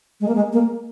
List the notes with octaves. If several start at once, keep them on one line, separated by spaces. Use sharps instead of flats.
G#3
A#3
G#3
A#3